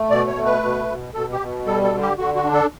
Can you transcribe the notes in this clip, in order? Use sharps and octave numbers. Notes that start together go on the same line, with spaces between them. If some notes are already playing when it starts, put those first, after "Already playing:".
Already playing: A3
B2 D5
C#5
A3
B4
B2
B2
B2 A4
G4
B2
G3 A4
A4
D3
G4
D3 F#4
F#4
D4
A4